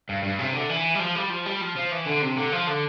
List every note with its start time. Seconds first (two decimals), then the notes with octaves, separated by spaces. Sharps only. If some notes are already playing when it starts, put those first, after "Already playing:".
0.09 G2
0.23 G2
0.39 C3
0.54 D3
0.70 E3
0.95 G3
1.00 F3
1.16 G3
1.30 F3
1.46 G3
1.61 F3
1.76 F3
1.91 E3
2.06 D3
2.22 C3
2.37 D3
2.52 F3
2.68 D3